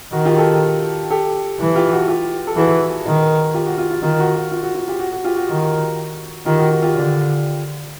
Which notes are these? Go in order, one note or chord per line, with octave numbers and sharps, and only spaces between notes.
D#3 F#4
F4 G4
G4 A4
G4 A4
E3
F4 G4
F#4
F4 G4
A4
E3 F#4 G#4
D#3
F4 G4
F#4
F4
F4
D#3 F4
F#4
F#4
F4
F#4
F4
F4 G4
F#4
F#4
F4 G4
F#4
D#3
D#3 F4 G4
F#4
F#4
F4 G4
D3